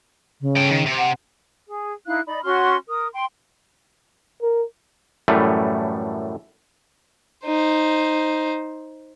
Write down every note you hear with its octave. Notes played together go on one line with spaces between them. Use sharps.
C#3
A4 G5
D#3
C3
F#5
G#4
D#4 E4 F5 F#6
D#4 D5 B5
C#4 F#4 C6 F6
A#4 D#6
G5 C6
A#4
F#2 A2 E3 G3 A3
D#4 C5